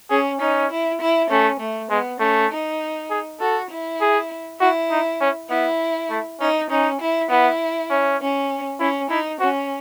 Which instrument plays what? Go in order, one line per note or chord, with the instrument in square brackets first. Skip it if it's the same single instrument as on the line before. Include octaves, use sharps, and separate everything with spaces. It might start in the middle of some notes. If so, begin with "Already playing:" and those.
[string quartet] C#4 [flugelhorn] G#4
[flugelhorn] C#4 [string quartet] D#4
[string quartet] E4
E4
[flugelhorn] A3 [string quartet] C#4
[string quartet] A3
[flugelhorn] G#3 [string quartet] B3
[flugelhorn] A3 [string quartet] C#4
[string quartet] D#4
[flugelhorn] G#4
[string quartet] F#4 [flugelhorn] A4
[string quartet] E4
[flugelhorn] G#4
[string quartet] E4 [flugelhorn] F#4
[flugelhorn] D#4
C#4
[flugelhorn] B3 [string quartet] E4
[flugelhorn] A3
[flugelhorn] C#4 [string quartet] D#4
[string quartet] C#4 [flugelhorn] D#4
[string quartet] E4
[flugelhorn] B3 [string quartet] E4
[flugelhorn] C#4
[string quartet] C#4
[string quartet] C#4 [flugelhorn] E4
[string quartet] D#4 [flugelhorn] E4
[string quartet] C#4 [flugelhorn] F#4